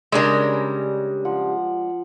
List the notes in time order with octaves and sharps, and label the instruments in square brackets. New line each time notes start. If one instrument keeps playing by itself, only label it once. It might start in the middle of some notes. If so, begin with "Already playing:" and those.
[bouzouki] C#3 G3 [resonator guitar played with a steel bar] G#3 D4 A#4
[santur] F3 F#5